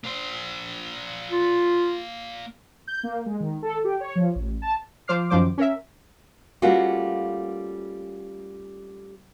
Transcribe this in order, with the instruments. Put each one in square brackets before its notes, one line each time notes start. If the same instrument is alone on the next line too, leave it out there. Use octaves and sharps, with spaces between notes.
[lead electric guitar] A#3 C5
[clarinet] F4
[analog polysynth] G6
A#3
G#3
D#3
A4
G4
C#5
F3
A1
A5
[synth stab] F3 C5 D6 F6 C7
F#2 D#3 F3 C5 D6
C#4 A#4 E5
[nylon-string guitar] G3 A3 A#3 C#4 F4 F#4